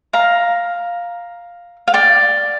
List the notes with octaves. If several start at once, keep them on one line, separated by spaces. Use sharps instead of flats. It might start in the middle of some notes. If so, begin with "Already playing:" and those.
F5 A#5
F5
D5 G5